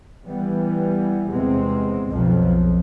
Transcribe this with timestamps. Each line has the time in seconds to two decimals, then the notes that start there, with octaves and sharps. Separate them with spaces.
0.24 E3 G3 B3
1.29 E2 C3 G#3 B3 C4
2.09 B1 F2 F3